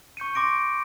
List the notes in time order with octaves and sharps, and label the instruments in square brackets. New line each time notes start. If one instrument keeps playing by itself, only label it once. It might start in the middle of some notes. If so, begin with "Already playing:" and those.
[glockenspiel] C#6 G6 C#7 D#7
C6 D6 A#6 D7